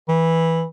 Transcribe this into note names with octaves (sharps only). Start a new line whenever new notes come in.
E3